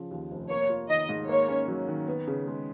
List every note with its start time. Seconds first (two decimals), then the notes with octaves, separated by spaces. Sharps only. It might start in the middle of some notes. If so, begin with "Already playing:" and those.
Already playing: C#3 F3
0.11 D#2
0.31 F1
0.50 A#3 C#5
0.69 F4
0.89 D#3 D#5
1.09 G#2
1.29 A#3 C#5
1.48 C#4
1.68 F#3
1.88 D#3
2.07 B3
2.28 C#3
2.47 G#3